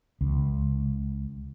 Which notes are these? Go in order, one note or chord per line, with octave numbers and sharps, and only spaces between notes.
C#2